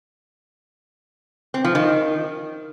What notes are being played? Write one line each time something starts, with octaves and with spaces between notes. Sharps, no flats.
C4
F3
D#3